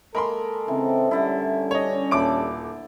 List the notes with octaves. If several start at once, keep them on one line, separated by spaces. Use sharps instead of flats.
G#3 A#3 A4 A#4 B5 C6
C#3 E3 C4
A2 D3 G3 C#4 E4
D4 C#5 D#5
D#1 E5 A5 B5 D6 D7